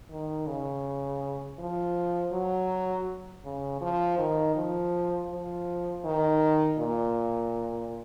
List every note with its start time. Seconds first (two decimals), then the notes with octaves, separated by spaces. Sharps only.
0.10 D#3
0.47 C#3
1.59 F3
2.32 F#3
3.45 C#3
3.81 F3
4.18 D#3
4.56 F3
5.30 F3
6.05 D#3
6.78 A#2